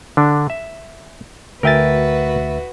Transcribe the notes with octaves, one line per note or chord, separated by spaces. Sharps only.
D3 D4
E5
D2 F#4 A#4 B4 E5 G5 G#5 A6